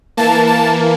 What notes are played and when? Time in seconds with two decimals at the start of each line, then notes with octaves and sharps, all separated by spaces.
0.17 E3 A#3 A5
0.47 A5